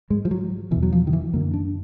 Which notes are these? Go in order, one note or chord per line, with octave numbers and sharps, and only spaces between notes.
G#2 G#3
F3
F#3
E2 B2 E3
F#3
F3
D#3
E3
F#2 D3 A#3
D4